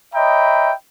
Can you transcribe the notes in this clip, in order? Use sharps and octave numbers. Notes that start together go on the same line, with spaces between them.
C#5 D#5 E5 G5 A#5 B5